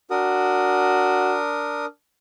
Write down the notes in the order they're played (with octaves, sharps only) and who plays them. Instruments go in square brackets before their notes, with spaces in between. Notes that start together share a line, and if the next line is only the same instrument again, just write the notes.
[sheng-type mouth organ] D4 A#4 D#6 [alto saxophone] F#4